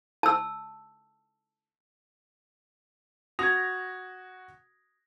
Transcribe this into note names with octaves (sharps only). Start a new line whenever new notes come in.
A5 E6
F#4 D#6 G#6 A#6 F7